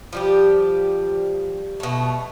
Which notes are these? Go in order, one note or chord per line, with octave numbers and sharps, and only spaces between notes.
F3 G3 G4
B2 A3